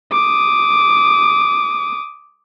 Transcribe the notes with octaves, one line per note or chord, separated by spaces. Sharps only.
D6 D#6